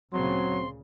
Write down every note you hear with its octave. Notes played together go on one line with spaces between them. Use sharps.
D2 A#2 C#3 F#3 C4 C6